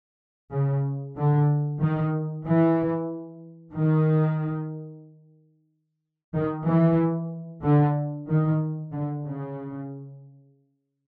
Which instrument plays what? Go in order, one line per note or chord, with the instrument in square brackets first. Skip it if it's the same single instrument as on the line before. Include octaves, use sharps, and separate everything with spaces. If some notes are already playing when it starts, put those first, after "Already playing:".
[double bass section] C#3
D3
D#3
E3
D#3
D#3
E3
D3
D#3
D3
C#3